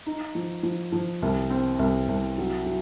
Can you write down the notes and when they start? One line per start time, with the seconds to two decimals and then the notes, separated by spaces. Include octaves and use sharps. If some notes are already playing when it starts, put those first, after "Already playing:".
0.06 D#4
0.35 F3
0.63 F3
0.92 F3
1.22 C2
1.50 C4
1.79 C2
2.09 C2
2.38 F#3
2.66 F#3